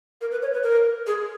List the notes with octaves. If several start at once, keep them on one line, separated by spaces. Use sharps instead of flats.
A#4
B4
C#5
B4
A#4
G#4